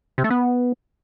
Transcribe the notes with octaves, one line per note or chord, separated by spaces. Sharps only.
C3
A3
B3